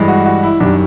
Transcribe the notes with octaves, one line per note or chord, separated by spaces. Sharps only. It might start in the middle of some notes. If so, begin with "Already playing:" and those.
Already playing: G2 E3 G#3
F#4
F#4
E4
F#2 D#3 G3 D4